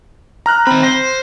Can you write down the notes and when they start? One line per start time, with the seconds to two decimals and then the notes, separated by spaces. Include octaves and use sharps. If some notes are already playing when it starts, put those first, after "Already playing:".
0.46 A#5 F6 F#6
0.67 D#3 C4 B5
0.83 C5 A#6